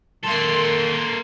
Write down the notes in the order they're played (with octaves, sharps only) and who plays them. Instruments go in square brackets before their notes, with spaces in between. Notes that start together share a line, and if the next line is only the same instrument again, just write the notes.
[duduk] D#3 [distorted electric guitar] A#3 A4 [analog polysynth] C6 C7